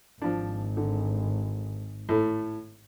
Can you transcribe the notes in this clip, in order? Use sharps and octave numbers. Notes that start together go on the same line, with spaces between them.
G#1 F3 D4
D3
A2 A3